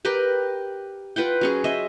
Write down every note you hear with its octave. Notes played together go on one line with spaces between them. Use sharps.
G4 A#4 B4 G5
F4 B4 F#5 G5
F#3 C#4 G#4
C5 D#5 E5